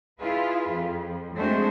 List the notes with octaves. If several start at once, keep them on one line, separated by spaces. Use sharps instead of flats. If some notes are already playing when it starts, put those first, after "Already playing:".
E4 F4 G#4 B4
F2
G#3 A3 C4 D4 F#4 C5